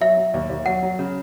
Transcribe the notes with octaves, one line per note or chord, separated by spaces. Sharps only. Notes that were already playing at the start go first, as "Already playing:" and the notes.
F#3 E5
F#3
D#2
D#2
F#3 F#5
F#3
C#3